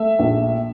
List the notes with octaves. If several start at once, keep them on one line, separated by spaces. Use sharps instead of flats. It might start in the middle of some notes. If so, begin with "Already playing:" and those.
Already playing: A3 E5
A#1